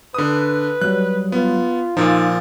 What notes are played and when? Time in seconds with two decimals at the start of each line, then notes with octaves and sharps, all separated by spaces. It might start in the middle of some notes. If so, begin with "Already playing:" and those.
0.14 D3 B4 D#6
0.81 F#3 G3 F#6
1.32 B3 F4
1.97 A#2 F3 D#4 F4